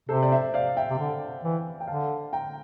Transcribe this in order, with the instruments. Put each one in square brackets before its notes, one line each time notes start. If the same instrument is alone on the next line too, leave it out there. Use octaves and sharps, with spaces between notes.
[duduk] C3 [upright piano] A4 C5
[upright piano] D5
C5 E5
D5 F5
E5 G5
[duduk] C3
D3
E3
[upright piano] G5
[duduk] D3 [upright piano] F5 A5
[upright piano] G5 A#5